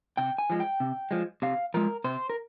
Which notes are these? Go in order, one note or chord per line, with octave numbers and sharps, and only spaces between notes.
C3 G5
G#5
F3 G#3
G5
C3
F3 G#3
C3 F5
F3 G#3 A#4
C3 C5
A#4